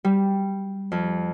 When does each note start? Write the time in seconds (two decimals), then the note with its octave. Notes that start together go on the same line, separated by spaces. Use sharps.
0.04 G3
0.92 F2